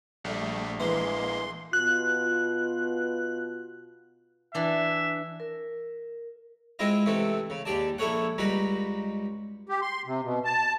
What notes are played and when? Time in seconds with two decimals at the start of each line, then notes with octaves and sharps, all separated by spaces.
0.24 A#1 G3 A3
0.80 E3 G#3 A#3 C6
1.73 B2 F4 F#6
4.55 E3 D4 E5
5.40 A#4
6.79 G#3 C4 E4 F4 D#5
7.06 C3 E3 A3 C4
7.50 C#3
7.65 D#2 G4 G#4 D5 A5
7.98 A#1 E4 G#4 A4 C#5 F#5
8.38 C#2 G3 D#4 F#4 B5
9.69 G4
9.82 C6
10.06 C3
10.23 B2
10.45 A5